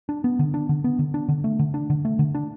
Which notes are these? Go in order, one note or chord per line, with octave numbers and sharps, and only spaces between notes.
D4
B3
D3
D4
D3
B3
D3
D4
D3
A3
D3
D4
D3
A3
D3
D4